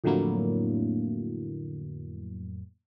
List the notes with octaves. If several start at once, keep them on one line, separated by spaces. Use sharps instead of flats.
F2 A2 D3 F#3 A#3 E4